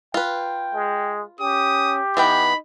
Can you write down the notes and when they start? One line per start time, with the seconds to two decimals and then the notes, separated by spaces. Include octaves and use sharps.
0.14 F4 B4 G5
0.75 G#3
1.41 C#4 G4 D#6
2.17 E3 B3 D#4 G5 B5